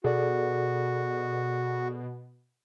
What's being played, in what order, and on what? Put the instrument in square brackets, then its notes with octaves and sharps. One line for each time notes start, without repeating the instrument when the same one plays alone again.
[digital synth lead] B2 [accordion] F#4 [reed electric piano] G#4 A4 D5